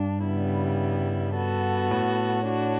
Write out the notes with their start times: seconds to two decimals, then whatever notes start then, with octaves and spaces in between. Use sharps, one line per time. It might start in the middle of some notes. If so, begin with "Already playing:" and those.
Already playing: G2 D4
0.25 C#3 G3 B3 E4
1.36 B3 F#4 A4
1.91 A2
2.47 D4 F#4 C#5